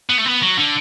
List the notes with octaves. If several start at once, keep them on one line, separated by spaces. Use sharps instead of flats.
B3
A3
B3
F#3
D3